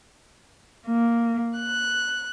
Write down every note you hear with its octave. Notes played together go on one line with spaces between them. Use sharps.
A#3
F#6